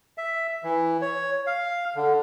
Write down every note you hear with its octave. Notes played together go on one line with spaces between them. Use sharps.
E5
E3
C#5
F5
D3